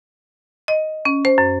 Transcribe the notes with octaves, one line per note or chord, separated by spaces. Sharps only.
D#5
C#4
C5
F#2